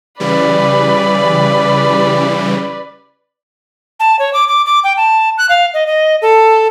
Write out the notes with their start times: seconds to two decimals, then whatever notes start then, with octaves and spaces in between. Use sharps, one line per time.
0.20 C#3 E3 G3 B4 D5
4.00 A5
4.19 C#5
4.33 D6
4.48 D6
4.66 D6
4.84 G5
4.97 A5
5.38 F#6
5.49 F5
5.74 D#5
5.87 D#5
6.22 A4